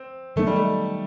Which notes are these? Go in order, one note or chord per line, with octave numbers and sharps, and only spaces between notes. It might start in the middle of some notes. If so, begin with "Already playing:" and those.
Already playing: C4
D#3 F#3 A3 B3 D#4
G3
A3